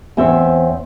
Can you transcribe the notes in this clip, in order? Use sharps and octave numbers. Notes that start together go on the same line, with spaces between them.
E2 C4 C5 C#5 E5